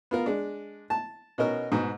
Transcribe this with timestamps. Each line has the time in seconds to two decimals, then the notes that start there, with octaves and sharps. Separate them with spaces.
0.11 B3 F4 A#4
0.26 G#3 D4
0.90 A5
1.38 B2 C#4 D#4 A#4
1.72 G#2 B2